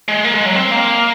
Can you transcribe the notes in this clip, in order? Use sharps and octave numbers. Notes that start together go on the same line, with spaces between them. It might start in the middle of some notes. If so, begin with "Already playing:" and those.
G#3
A#3
G#3
F#3
C4
A#3